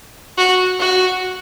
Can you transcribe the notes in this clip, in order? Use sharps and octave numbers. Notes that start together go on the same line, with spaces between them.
F#4
F#4